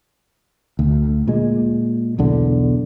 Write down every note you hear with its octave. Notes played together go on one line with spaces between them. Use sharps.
D2
A#2 G#3
B1 E2 D3